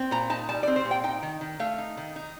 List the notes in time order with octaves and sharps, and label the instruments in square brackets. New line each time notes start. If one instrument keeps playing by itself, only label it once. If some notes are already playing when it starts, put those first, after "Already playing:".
Already playing: [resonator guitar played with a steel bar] C4
A#2 A#5
D#4 A5
G3 A5
D5
C4
C5
A#2
G5
D#4 G5
D#3
D#3
A3 F5
D#4
D#3
D#4